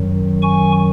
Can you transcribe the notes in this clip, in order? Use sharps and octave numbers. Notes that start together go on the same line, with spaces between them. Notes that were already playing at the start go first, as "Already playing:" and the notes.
Already playing: F#2 D#3 F#3
G#5 C#6